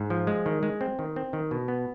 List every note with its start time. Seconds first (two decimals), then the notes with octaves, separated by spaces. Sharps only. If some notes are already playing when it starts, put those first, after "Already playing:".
Already playing: G#2
0.10 F3
0.27 G#3
0.46 D#3
0.63 G#3
0.81 C4
0.99 D#3
1.16 C4
1.33 D#3
1.51 B2
1.68 B3